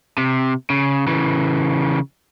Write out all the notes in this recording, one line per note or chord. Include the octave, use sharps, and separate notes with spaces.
C3
C#3
C#3 E3